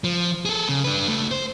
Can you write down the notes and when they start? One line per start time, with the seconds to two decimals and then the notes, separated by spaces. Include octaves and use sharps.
0.04 F3
0.45 G#4 A4
0.69 C#3
0.84 D4 B4
1.08 C#2 A3
1.31 C5